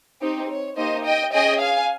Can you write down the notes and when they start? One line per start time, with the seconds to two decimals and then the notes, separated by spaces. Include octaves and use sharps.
0.20 C4 D#4 G4
0.49 C#5
0.76 A#3 D#4 G4 C5 D#5
1.04 D#5 G5
1.33 C#4 G#4 D#5 G5
1.61 F5 G#5